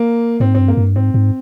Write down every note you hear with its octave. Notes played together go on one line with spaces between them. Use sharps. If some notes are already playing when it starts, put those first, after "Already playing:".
Already playing: A#3
G#2 C4
G2 C4
A#3
G2
G#2 C4
G#2